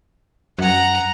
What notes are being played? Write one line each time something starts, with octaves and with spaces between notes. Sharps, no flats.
F#2 F#5 A#5